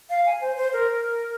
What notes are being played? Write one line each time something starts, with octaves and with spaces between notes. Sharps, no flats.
F5
G#5
C5
C5
A#4